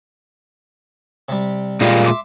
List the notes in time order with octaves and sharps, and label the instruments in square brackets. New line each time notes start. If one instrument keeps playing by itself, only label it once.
[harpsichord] C3 G3
[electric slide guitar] A#2 G#3 F4 [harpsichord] G3 F5 G5
[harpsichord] E5 C6 D6